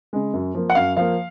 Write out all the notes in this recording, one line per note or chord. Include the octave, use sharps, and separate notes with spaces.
C#3 G#3
F#2
F3 A#3
F#5
F#2 F5
F3 A#3 F5